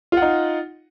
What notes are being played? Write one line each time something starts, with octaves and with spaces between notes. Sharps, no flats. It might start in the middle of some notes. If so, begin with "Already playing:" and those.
D#4 F4 F#5